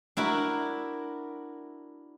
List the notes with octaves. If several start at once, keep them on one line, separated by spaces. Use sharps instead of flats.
D4 E4 F#4 A#4